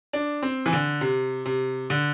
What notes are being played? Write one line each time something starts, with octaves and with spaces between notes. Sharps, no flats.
D4
C4
E3
D3
C3
C3
D3